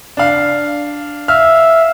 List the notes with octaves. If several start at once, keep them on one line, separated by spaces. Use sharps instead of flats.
D4 F5
E5 F5 F6